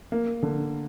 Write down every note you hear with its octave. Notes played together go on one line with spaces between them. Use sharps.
A#3
D3